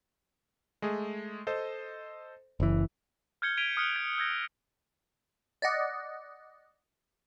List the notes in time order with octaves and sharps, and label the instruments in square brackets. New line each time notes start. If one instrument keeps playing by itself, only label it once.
[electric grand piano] G#3 A3 G#4
A4 C5 D#5
[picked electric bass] F#1 E3
[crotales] F6 G6 G#6 C#7 G7
G#6 B6 D7 D#7 F7 G7
D#6 F6 F#6 C#7 G7
G#6
E6 G6 G#6 A#6
[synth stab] D5 D#5 F#5